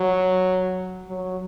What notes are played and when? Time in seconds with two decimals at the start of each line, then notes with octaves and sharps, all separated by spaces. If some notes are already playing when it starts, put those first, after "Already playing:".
Already playing: F#3
1.07 F#3